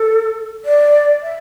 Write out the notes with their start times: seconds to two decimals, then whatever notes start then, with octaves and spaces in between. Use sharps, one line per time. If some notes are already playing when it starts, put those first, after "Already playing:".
Already playing: A4
0.65 D5
1.23 E5